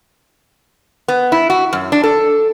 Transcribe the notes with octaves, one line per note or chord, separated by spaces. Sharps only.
B3
E4
F#4
F#2
D4
A4